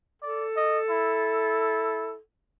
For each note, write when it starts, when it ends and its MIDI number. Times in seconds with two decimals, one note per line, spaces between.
0.22 2.18 69
0.22 0.45 74
0.57 0.79 75
0.90 2.15 64